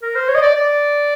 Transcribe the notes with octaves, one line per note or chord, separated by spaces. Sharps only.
A#4
C5
C#5
D#5
D5
D5